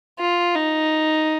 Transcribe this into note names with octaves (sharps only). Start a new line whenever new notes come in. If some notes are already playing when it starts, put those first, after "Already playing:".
F4
D#4